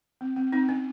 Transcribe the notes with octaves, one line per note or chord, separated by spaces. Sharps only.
C4
C4
C4 D#4
C#4